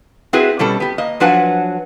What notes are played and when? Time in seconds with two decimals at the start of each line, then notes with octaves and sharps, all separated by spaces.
0.33 A3 C4 E4 F#4 G#4 B4
0.59 B2 G3 C#4 A4
0.80 B3 G4
0.98 A#3 D#5
1.20 F3 F#3 D4 B4 F#5 G#5